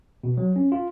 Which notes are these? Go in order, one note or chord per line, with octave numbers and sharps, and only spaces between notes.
B2
F#3
C#4
F4